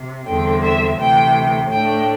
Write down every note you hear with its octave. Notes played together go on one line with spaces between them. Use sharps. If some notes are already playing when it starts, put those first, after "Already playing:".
Already playing: C3
E2 D3 G3 C4 G5
E5
D2 C3 E3 G5
A2 A3 D4 G5